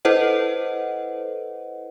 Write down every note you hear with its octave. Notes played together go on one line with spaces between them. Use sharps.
E4 A4 B4 C5 D#5 F#5